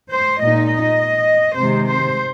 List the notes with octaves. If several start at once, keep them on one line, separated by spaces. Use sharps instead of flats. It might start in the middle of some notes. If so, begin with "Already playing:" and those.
C5
A#2 G#3 D#4 D#5
D#5
C3 D#3 G#3 C5
C5